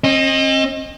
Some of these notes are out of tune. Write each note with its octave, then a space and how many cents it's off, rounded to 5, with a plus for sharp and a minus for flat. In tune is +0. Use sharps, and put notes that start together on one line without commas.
C4 +45 D#5 +0